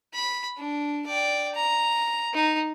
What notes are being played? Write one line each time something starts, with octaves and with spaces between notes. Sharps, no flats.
B5
D4
D5 G5
A#5
D#4